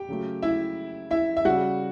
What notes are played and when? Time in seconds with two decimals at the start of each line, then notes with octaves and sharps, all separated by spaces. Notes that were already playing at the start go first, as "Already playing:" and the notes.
Already playing: G4 G5
0.09 C#3 F#3 A3
0.42 E4 E5
1.11 E4 E5
1.37 E5
1.45 C#3 G3 F#4 F#5